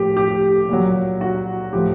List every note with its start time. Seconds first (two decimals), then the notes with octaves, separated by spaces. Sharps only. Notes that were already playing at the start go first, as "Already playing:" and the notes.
Already playing: A2 F3 G4
0.17 G4
0.69 A#2 F#3
1.21 F#4
1.73 A2 F3 G4